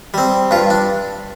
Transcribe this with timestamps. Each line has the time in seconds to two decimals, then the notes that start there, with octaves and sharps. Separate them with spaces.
0.14 G3 C4
0.51 G2 F4
0.70 D4